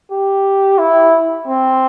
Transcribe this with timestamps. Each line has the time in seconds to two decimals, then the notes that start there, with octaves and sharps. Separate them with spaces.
0.11 G4
0.78 E4
1.48 C4